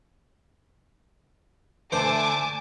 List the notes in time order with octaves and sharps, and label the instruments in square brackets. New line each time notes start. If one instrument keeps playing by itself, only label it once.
[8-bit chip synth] D3 A3 D4 [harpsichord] C5 [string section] G#5 A5 D6